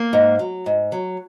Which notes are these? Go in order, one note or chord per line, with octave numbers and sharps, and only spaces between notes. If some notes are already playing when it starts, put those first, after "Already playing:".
Already playing: A#3
G#2
F#3
G#2
F#3